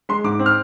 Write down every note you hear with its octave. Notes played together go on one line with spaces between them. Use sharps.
G#3 C6
G#2 D6
C4
F6